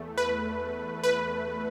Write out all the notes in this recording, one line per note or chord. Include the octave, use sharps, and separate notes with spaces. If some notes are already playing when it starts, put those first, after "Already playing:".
Already playing: E2 A3
B4
B4